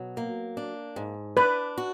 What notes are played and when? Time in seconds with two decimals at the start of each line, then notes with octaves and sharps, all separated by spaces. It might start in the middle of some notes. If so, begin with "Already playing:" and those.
Already playing: B2 F#3
0.17 A#3
0.57 D4
0.96 G#2
1.37 D4 B4
1.78 F#4